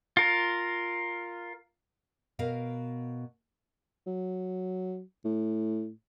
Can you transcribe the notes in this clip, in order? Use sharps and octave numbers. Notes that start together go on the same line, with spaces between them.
F4 A#4
B2 A#4 F5
F#3
A2